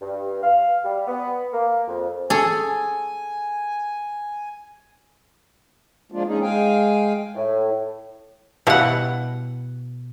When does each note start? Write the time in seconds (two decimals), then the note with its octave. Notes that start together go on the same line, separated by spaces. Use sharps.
0.01 G2
0.42 F5
0.84 G3
1.07 B3
1.53 A#3
1.88 F2
2.30 G#4 A4 C#5 G#5
6.12 F3 G#3 A#3 D4 F4
6.27 G#3 C#4 D#4 G#4
6.42 G#3 F5 G5 G#5
7.35 A2
8.67 B2 G3 E4 F5 F#5